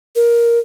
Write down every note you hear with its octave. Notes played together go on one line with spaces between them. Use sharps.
A#4